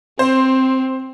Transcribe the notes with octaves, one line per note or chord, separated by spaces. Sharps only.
C4 C5